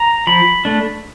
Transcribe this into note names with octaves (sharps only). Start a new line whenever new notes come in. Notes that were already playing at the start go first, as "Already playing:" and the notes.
Already playing: A#5
F3 B5
A3 D4